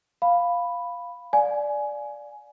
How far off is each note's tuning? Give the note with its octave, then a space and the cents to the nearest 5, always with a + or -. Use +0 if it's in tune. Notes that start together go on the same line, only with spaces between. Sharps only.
F5 +0 B5 +0
D5 +0 F5 +30 G#5 +15